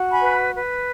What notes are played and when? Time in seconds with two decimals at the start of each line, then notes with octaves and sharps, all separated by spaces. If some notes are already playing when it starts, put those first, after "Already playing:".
Already playing: F#4
0.11 G#5 B5
0.22 B4
0.55 B4